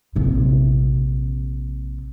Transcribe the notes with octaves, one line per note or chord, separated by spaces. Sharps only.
A#1 C3